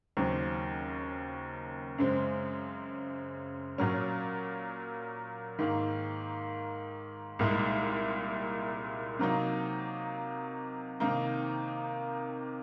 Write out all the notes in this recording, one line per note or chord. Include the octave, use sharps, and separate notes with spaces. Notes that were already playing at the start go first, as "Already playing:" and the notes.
D#2 C#3 F#3 C4
F#2 C#3 G#3 C4
A#2 F#3 C#4
G#2 D#3 A#3
C2 A#2 G#3 D#4
C3 F#3 A#3 D#4
C3 D#3 A#3 D#4